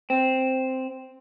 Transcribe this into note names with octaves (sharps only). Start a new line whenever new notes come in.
C4